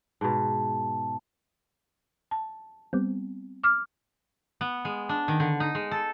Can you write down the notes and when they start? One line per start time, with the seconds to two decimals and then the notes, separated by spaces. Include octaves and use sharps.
0.21 G#2 B2 A5
2.31 A5
2.93 G3 B3 C4
3.64 D6 F6
4.61 B3
4.85 G#3
5.09 D4
5.28 D#3
5.40 D3
5.60 D#4
5.75 G#3
5.91 A4